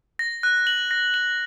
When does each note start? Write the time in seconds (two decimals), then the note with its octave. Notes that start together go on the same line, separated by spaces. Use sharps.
0.19 A#6
0.43 F#6
0.67 F#7
0.91 A#6
1.14 F#7